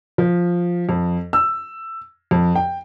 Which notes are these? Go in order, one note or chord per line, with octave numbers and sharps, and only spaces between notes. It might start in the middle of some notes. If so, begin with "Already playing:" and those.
F3
F2
E6
F2
G5